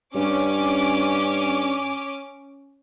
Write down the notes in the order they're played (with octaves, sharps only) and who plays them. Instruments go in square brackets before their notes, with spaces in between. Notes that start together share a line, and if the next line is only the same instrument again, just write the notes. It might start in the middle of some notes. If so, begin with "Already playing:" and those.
[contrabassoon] G2 [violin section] C#4 D6